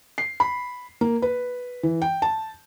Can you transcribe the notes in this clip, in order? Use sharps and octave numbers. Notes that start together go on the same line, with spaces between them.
C7
B5
A#3
B4
E3
G5
A5